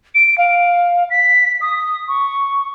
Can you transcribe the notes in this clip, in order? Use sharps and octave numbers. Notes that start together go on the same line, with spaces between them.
D7
F5
B6
D#6
C#6